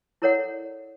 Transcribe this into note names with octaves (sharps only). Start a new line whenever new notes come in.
E4 A4 A#4 C#5 D5 F#5